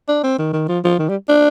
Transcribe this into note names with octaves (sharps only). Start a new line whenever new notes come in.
D4
C4
D#3
D#3
F3
F3
D#3
G3
D4